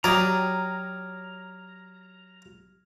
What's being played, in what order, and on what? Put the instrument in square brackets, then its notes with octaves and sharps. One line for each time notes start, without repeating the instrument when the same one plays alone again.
[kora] F#3 G4 [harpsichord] D5 D#5 [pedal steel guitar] A#5 [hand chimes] F6 G#6